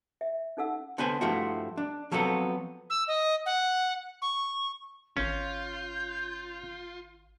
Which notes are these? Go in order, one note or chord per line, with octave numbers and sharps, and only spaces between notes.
E5
C#4 D#4 A4 F#5 E6
D3 B3 B4 C5 G#5
G2 F3 A3 E4 F#4
D4
F3 F#3 B3 C4 A4
E6
D#5
F#5
C#6
G#1 C#4 F4 G6